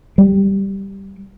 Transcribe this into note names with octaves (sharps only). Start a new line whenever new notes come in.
G3